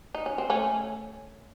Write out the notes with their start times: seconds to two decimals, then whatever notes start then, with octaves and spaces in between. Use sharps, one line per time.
0.15 D#4
0.26 C#4
0.38 C4
0.50 A3 C#4